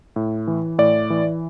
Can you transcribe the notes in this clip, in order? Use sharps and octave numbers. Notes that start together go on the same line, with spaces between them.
A2
E3
A2 D5
E3